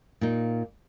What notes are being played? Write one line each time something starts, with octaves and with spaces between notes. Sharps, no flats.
A#2 A#3 D#4